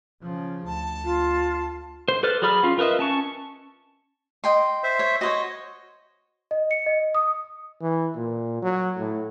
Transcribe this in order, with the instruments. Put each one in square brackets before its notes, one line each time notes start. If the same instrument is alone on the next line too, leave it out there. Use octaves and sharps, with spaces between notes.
[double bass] C#3 F3
[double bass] D2 [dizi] A5
[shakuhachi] F4
[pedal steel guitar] C5
A4 B4 C5 D5 F6
F#3 G#4 D5 B5 F6
C#4 F4
F4 A#4 B4 D#5 E5
C#4 A5 C#6
[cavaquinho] D#5 G5 C6
[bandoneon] C5 E5
[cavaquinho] C#5
[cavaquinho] F#4 C5 C#5 [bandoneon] D#5
[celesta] D#5
C#7
D#5
D#6
[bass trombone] E3
A#2
F#3
A2